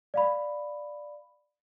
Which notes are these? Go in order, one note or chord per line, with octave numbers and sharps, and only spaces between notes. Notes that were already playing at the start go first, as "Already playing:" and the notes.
D5 F5 B5